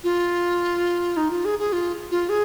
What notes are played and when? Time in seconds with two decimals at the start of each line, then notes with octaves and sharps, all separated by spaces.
0.04 F4
1.17 D#4
1.31 F4
1.45 G#4
1.59 G#4
1.73 F4
2.11 F4
2.29 G#4